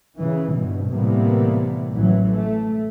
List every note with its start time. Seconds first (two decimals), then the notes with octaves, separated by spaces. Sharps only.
0.19 C#3 E3
0.53 G2 B2
0.89 A2 C3 E3 G3 A#3 B3
1.92 A1 E3 F#3
2.31 A3